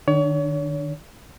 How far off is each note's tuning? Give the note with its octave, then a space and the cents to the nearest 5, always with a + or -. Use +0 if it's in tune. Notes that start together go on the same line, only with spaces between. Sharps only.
D#3 -35 D4 +0 C#5 +35